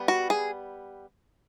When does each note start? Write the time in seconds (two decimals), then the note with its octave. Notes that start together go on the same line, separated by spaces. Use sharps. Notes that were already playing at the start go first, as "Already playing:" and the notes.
Already playing: G3 B3
0.08 F#4
0.30 G#4